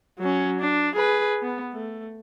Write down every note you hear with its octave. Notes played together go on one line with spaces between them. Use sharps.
F#3 C#4
D4
G#4 B4
B3
A3